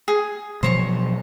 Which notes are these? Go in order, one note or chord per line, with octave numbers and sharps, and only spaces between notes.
G#4
B2 F3 F#3 C5 C#5 C#6